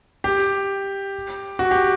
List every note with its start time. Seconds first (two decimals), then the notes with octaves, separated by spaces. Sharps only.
0.24 G4
1.59 F#4
1.71 G4